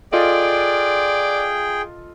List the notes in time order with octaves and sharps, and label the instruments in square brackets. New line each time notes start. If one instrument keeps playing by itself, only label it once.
[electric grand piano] F4 A4 D#5 [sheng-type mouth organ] G#4 G5 [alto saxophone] D5